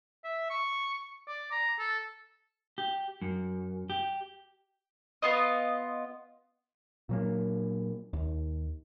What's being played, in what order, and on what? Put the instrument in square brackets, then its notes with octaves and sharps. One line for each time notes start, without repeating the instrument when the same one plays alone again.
[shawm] E5
C#6
D5
A#5
A4
[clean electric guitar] G4
F#2
G4
[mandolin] B3 F4 D#5
[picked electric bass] A#2 F#3 A#3
D#2